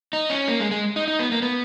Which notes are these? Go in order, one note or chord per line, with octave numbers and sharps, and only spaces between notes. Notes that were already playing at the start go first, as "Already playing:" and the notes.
D#4
C#4
A#3
G#3
G#3
D#4
D#4
B3
A#3
B3